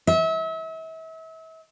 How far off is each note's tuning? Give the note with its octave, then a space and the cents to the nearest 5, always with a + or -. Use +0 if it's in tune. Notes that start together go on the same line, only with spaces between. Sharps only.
E5 -35